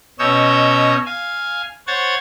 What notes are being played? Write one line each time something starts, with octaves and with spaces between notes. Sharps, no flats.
B2 C#4 C#5 D#5 E6 G6
F5 G#5
C5 C#5 F#5 G#6 A6